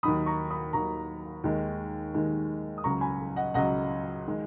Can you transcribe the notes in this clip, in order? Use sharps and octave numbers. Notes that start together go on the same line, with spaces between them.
D#2 D#3 F#3 B5 D#6
A#5 C#6
B5 D#6
D#2 D#3 F#3 A#5 C#6
D#2 D#3 G#3
D#2 D#3 G#3
D#6
C#2 C#3 F#3 A#5 C#6
G#5 B5
D#5 F#5
C#2 C#3 F#3 D#5 F#5
D#3 G#3